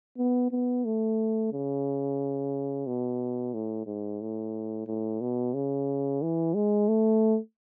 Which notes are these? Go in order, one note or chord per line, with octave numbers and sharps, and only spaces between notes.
B3
B3
A3
C#3
B2
A2
G#2
A2
A2
B2
C#3
E3
G#3
A3